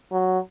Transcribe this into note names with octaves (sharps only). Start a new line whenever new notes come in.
F#3